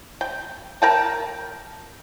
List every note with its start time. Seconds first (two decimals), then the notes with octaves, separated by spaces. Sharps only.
0.21 G5
0.82 A#4 G5 A5